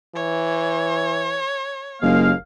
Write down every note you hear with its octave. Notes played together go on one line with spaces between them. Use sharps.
E3 C#5
F#1 D#2 G#3 A#3 F5